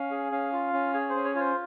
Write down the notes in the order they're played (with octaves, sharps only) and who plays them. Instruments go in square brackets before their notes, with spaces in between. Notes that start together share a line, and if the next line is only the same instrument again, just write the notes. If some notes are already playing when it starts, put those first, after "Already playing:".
Already playing: [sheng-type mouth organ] C#4 F5
G#4
C#4 F5
F4
C#4
G#4 C#5
C#4 C5
C#5
F4 C#5
C5